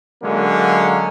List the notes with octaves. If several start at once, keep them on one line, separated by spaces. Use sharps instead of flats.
D3 F#3 G#3 A#3 C#4